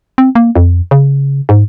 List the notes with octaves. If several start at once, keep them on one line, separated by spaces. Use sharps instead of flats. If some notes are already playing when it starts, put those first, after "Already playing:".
C4
A#3
F2
C#3
G#2